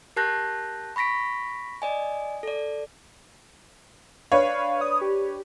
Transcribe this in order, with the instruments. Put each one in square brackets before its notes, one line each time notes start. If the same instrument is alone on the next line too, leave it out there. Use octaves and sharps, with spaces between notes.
[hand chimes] G4 A#4 A5 F#6 G6 A#6
B5 C#6 A#6 B6 D7
D5 D#5 G#5
A4 D5
[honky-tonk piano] D4 B4 C#5 [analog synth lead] F5
[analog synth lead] D#6
G4